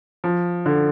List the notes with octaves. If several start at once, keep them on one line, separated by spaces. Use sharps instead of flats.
F3
D3